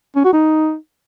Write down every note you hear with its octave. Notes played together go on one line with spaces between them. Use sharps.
C#4
F#4
D#4